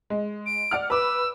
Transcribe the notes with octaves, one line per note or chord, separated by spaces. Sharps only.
G#3
D7
D5 F#5 F6
B4 D6 E6